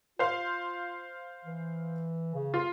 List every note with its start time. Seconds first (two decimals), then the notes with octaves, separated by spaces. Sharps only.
0.19 F4 C5 F5
1.45 E3
2.35 C#3
2.54 F4